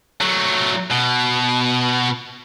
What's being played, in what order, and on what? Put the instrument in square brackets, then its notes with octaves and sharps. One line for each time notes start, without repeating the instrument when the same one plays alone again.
[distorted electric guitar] F#3 A3
B2